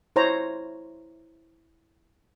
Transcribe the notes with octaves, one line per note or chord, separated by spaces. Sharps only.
E4 C5 C#5 A#5